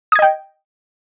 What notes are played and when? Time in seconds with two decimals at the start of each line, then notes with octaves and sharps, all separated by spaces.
0.12 D#6
0.15 G#6
0.19 D#5
0.22 G5